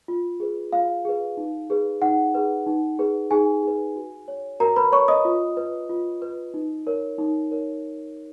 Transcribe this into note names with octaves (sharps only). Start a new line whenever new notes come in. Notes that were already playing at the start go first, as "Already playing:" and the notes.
F4
G#4 B4
F4 F5
G#4 B4
D#4
G#4 B4
D#4 F#5
G#4 B4
D#4
G#4 B4
D#4 G#4 G#5
G#4 B4
F#4
C#5
F#4 A#4 A#5
B4 B5
C#5 C#6
D#5 D#6
F4
B4
F4
B4
D#4
A#4 C#5
D#4
A#4 C#5